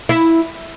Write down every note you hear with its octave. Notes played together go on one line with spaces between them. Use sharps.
E4